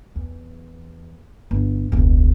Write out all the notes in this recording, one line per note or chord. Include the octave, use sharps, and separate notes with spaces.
E2
G1
E1 C#2